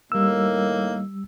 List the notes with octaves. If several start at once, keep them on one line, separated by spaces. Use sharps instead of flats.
A2 D#3 G3 A#3 E6